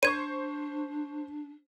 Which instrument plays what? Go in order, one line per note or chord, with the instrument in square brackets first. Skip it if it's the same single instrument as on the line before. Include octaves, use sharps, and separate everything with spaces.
[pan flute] D4 [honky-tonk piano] C5 C#6 [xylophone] G#6 D#7